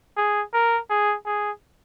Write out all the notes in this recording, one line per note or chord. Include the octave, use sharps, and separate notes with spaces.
G#4
A#4
G#4
G#4